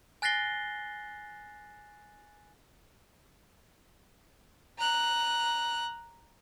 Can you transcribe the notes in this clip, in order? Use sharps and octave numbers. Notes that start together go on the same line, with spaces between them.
G#5 F#6 A6 A#6 C7 G7
A#5 F#6